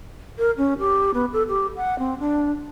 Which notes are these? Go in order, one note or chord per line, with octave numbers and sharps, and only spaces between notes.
A#4
C#4
G4
B3
A4
G4
F#5
C4
D4